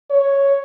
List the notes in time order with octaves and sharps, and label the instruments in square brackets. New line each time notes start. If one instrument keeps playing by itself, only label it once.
[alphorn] C#5